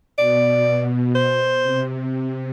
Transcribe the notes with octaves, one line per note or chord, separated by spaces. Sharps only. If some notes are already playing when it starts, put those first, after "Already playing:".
B2 D5
C5
C3